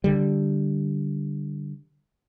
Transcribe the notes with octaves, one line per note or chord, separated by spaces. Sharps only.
D3 G3